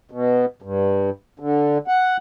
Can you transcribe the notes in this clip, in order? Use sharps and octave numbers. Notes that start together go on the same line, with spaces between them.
B2
G2
D3
F#5